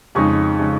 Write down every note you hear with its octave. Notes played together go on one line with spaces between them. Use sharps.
F2 C#3 G#3 D#4 C#6
C#3 G#3 D#4